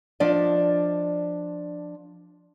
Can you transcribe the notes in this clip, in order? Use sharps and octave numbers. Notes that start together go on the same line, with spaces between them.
F3 D4 D5 D#5